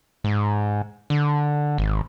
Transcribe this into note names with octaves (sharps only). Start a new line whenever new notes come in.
G#2
D3
G#1